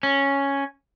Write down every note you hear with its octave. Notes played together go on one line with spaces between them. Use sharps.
C#4